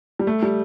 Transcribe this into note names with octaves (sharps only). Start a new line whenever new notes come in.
G3
A3
G3